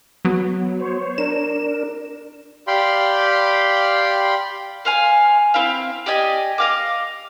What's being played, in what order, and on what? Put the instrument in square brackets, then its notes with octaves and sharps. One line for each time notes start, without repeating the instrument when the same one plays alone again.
[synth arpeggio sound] F#3 B3
[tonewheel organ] C5 C#5
[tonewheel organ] D4 A#4 [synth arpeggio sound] E7
[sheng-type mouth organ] G4 D5 F5 G5 B5 C6
[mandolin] C5 F5 G#5
C4 E4 F5
G4 D5 D#5 G#5
D#5 F5 D6